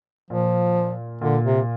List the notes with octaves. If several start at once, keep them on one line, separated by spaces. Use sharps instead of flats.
A#2 F3
A#2 D3
C3